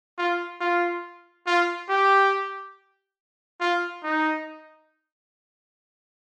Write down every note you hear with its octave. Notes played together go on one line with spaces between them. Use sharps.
F4
F4
F4
G4
F4
D#4